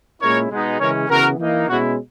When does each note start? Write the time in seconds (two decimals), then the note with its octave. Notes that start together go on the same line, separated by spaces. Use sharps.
0.21 A#2 G#3 C#4 E4 A#4 C#5
0.51 B2 G#3 B3 D#4
0.80 C#3 E3 G#3 C#4 A#4 C#5
1.09 C#3 E3 B3 F#4 A#4
1.39 E3 A#3 D#4
1.69 B2 G#3 C#4 E4 F#4